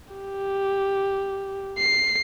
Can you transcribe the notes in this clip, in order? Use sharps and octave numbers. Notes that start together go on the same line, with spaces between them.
G4
C7